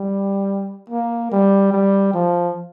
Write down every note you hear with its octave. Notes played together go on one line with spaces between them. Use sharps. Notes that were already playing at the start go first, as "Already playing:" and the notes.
Already playing: G3
A#3
G3
G3
F3